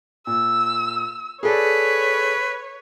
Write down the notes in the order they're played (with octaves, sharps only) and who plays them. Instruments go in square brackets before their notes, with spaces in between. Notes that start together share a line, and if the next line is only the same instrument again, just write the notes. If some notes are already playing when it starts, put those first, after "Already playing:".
[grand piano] A#2 [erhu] E6
[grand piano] G#4 A4 D5 [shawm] B4 [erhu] C#5